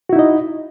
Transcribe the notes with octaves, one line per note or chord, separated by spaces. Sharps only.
D#4 E4 F#4 D#5